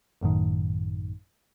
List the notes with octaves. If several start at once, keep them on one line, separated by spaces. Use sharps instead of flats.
A1 F#2 A2 D#3